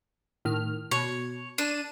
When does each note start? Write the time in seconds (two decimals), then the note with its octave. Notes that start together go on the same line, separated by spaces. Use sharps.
0.45 A2 D#3 F6
0.91 B2 C#5
1.58 D4 D#7 E7